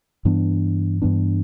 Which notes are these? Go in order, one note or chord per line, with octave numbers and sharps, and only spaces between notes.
G2 E3 B3 D4
G2 E3 B3 D4